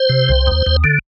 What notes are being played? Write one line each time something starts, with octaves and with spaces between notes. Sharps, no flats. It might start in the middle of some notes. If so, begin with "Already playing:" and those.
Already playing: C5
C3
C2
D#2
D#2
D3